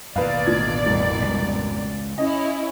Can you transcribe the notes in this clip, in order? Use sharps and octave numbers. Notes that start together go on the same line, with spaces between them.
A1 D#2 B2 B4 D5 F5
D2 F4 G#6
F1 C2
C#2
C#4 E4 D#5